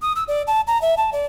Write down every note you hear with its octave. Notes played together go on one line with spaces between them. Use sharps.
D#6
E6
D5
A5
A#5
E5
A5
D5